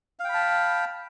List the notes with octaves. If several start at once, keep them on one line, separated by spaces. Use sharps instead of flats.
F5 G5 A5 B5